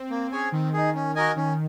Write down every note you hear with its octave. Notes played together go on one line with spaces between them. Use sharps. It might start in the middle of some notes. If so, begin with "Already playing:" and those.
Already playing: C4
A#3
C#4 G#4 C#5 G#5
D#3 C4
D#4 G#4
C#4
F#4 A#4 D#5 G#5
D#3 C#4